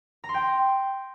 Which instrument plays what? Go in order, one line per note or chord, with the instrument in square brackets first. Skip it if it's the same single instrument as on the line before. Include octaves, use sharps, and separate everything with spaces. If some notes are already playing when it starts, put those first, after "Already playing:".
[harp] A#5
C6
G5